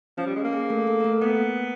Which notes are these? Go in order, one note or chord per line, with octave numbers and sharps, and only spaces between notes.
F3 C#4
G3
G#3
A#3
G#4
A3 A4
A3 A4
A#4
A3 A4
A#3 B3 A#4